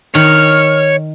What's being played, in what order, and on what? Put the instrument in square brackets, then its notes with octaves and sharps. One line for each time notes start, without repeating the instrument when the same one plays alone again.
[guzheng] D#3 [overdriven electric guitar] C#5 [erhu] F6